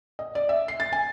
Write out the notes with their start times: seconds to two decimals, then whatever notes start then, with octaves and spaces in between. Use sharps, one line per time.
0.19 D#5
0.35 D5
0.49 E5
0.68 C7
0.80 A6
0.93 G#5